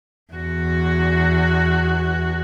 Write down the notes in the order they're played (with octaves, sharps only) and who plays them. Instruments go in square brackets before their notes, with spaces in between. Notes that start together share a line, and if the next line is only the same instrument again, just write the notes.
[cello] E2 F#4